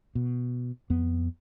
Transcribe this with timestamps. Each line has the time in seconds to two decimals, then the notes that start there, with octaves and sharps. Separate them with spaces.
0.15 B2
0.90 F2 B3